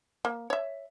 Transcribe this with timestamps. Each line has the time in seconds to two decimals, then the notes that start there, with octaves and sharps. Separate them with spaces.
0.25 A#3
0.50 C#5 E5